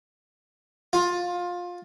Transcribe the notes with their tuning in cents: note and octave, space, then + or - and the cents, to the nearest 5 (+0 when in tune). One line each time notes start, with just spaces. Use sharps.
F4 +20